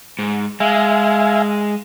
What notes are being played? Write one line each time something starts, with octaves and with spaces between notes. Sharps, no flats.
G#2
G#3 E5 F5 G#5